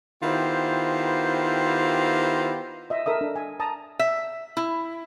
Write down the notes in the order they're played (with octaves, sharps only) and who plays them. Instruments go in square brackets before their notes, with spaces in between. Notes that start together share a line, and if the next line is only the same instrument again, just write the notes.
[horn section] D#3 B3 E4 F4 G4 C5
[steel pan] D#5 E5
A4 A#4 E5 D#6
D4
G#5
A5 A#5 D#6
[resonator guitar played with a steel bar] E5
E4